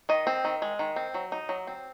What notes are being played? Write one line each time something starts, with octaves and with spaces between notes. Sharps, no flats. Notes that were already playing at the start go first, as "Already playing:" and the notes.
D#3 D#5
C4
D#3
G#3
D#3
C4
F#3
D#4
F#3
C4